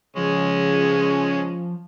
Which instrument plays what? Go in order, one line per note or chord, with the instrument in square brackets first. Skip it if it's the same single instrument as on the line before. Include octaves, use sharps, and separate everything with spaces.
[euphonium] C#3 [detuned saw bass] F3 [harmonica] G#3 C#4